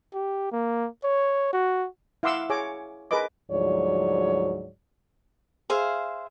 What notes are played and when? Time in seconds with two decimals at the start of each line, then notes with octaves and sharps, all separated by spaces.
0.14 G4
0.52 A#3
1.04 C#5
1.53 F#4
2.23 E4 F5 F#5 C6 D6 E6
2.50 G#4 C#5 G#5 D6
3.11 G#4 A#4 B4 D#5 D6
3.51 D2 G#2 F3 F#3 C#5 D5
5.70 G#4 C5 E5 F5